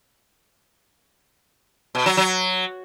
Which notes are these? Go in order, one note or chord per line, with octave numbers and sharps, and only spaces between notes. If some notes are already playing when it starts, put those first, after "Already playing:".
B2
F#3
F#3